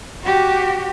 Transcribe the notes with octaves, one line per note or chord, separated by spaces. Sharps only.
F#4 G4